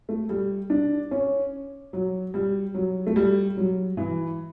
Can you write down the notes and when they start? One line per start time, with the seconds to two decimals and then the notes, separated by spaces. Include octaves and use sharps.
0.09 A3
0.29 G3
0.70 D4
1.11 C#4
1.93 F#3
2.34 G3
2.74 F#3
3.07 A3
3.16 G3
3.57 F#3
3.97 E3